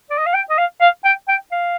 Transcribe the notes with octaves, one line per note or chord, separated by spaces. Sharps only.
D5
D#5
F5
G5
D#5
F5
F5
G5
G5
F5